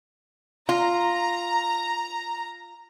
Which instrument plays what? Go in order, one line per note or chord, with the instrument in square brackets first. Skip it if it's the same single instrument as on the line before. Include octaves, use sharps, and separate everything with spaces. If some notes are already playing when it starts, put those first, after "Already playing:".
[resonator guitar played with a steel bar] F4 [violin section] A#5